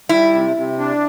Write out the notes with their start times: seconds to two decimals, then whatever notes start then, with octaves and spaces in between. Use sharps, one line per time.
0.09 G3 E4
0.33 C3
0.56 C3
0.79 D4